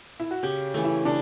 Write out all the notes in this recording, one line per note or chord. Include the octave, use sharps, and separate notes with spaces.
E4
F#4
C#3 G4
E3 A3
E4
C#3 D4